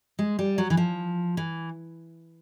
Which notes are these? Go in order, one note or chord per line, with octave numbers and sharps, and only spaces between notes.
G#3
G3
F#3
E3
F3
E3